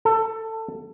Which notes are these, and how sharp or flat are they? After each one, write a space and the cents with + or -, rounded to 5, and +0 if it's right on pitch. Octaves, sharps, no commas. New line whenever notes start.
A4 +20